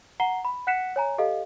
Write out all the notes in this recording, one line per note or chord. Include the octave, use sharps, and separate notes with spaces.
F#5 A#5 C7 G7
B5
F#5 F#6 B6 C#7 E7
C#5 G#5 A#5
G4 A4 D#5 F5